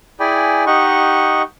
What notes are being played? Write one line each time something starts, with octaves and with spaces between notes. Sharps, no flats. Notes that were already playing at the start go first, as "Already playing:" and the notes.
E4 G#4 D5 G5 G#5 B5
D#4 G4 D#5 F#5 C#6